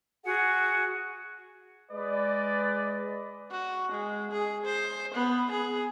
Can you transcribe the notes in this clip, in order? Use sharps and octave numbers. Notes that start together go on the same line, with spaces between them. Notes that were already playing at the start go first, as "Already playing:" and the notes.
F#4 G#4 F#5
G#3 B4 D5 D#5
F#4
G#3
G#4
C5
B3
G#4